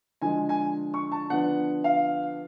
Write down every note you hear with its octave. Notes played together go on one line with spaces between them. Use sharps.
D3 F3 G#3 G#5
G#5
C#6
A5
D3 F3 B3 D4 F#5
F5